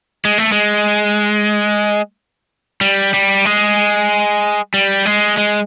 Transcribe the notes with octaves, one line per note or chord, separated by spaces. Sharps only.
G#3
A3
G#3
G3
G3
G#3
G3
G#3
G#3